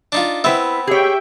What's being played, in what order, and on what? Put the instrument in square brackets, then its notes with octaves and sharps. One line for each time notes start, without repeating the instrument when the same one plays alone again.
[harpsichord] D4 D#4 F4
[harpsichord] B3 C4 [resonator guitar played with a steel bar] E4 B4 E5
[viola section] G4 E5 G5 [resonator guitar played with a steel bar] G#4 C#5